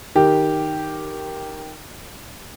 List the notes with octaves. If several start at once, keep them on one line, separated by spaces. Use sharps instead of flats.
D#3 G4